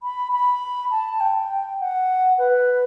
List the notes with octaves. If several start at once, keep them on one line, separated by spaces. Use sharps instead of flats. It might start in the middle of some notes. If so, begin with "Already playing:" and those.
B5
B5
A5
G5
F#5
B4